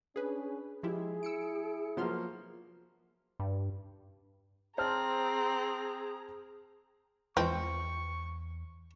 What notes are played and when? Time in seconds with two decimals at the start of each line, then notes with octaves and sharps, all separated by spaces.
0.16 C#4 D4 G#4 B4
0.83 F3 G#3 E4 G4 G#4
1.23 E4 E6 C#7 D7
1.97 F3 F#3 A#3 B3 C6 F6
3.40 G2
4.78 C4 G#4 C5 A5 A#5 F6
7.37 E2 E3 F3 G#3 C4 C#6